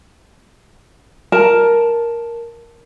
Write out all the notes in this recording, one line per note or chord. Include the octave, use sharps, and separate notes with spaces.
A#4 A5